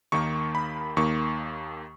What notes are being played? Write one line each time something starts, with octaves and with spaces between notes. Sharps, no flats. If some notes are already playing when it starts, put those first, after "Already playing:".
D#2 D#3 A#3 C#6
B5
D#2 D#3 A#3 C#6